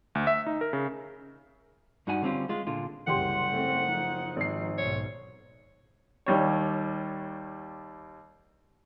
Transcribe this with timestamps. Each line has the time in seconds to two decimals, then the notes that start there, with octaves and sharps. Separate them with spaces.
0.15 D2
0.27 E5
0.47 D#4
0.61 A#4
0.73 C#3
2.07 G2 D#4 F#4 F#5 G#5
2.22 D3 G3 C4 C#4 F4
2.49 G#3 F4
2.67 A#2 D3 F4
3.07 F#1 C2 F#2 G4 F#5 C6
3.51 A3 C4
3.85 F3 D#4
4.36 G#1 C7
4.78 B1 G#2 C#5
6.26 D#2 G3 C#5